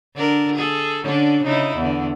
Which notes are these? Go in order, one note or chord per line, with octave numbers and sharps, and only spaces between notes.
D3 D4 A#4
G#4 A4
D3 C#4 D4
C#3 D#4 E4
E2 D3